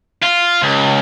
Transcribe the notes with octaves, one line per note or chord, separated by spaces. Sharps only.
F4
C#2